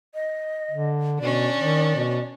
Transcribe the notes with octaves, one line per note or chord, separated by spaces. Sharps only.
D#5
D3
B2 C#4 D4 D5
D#3
B2